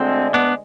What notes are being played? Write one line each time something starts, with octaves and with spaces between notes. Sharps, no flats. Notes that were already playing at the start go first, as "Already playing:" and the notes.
Already playing: D2 D3 G#3 C4
B3 D4